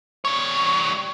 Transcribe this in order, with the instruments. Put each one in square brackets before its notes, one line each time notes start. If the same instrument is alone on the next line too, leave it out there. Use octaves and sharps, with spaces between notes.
[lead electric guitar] G3 C#5